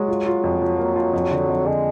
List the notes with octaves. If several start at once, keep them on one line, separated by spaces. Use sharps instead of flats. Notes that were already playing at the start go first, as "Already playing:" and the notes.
Already playing: F#3 G#3
F4
F4
F2
F3
A#3
F4
F2
D3
F2
D3 G#3